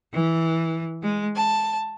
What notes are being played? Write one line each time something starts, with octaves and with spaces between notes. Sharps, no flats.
E3
G#3
A5